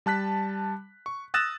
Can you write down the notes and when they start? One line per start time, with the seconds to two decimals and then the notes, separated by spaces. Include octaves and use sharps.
0.06 G3 A5 F#6 B6
1.06 C#6
1.34 D#6 E6 F#6 A6 A#6 E7